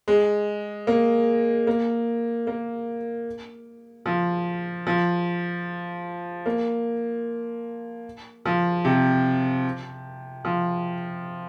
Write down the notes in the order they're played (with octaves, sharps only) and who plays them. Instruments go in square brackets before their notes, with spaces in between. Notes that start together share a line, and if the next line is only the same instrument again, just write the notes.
[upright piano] G#3
A#3
A#3
A#3
F3
F3
A#3
F3
C3
F3